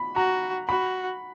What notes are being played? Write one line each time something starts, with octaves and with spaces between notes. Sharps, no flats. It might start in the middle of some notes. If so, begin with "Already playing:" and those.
Already playing: B5
F#4 A#5
F#4 B5